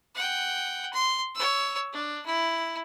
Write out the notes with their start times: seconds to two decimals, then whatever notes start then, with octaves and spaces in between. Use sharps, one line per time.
0.15 F#5 G5
0.93 C6
1.35 C#5 E6
1.93 D4
2.26 E4